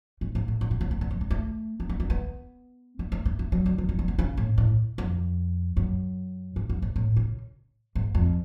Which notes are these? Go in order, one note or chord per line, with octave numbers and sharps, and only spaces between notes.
G#2
G#2
A2
C#3
B2
C#3
D3
D3
F3
G#3
A3
B3
A3
B3
B3
A3
A3
B3
A3
F#3
D3
F3
F#3
F3
D3
C#3
A2
A2
F2
F#2
G#2
F#2
G#2
A2
C#3
G#2
F2